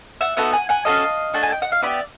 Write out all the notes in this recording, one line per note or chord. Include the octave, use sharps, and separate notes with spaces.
E5 F#5
B3 D#4 F#4 A4 E5 F#5
F#5 G#5
F#5 G#5
C#4 F#4 A4 D#5 F5
A3 D4 F#4 A4
G#5
G5
F#5
F5
B3 E4 G4 D5 E5